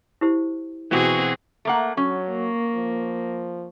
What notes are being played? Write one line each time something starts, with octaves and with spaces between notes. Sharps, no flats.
E4 G4 C5
B2 E3 C4 F#4 G#4
A3 A#3 F#5
F#3 C#4
A#3
F3